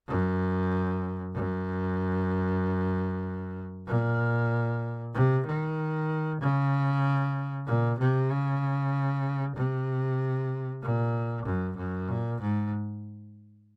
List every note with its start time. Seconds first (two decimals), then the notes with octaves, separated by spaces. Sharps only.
0.08 F#2
1.35 F#2
3.87 A#2
5.14 C3
5.46 D#3
6.41 C#3
7.66 A#2
7.99 C3
8.31 C#3
9.56 C3
10.82 A#2
11.46 F#2
11.77 F#2
12.08 A#2
12.41 G#2